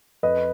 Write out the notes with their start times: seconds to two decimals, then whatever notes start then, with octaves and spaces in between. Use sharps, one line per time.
0.23 F2 B4 D#5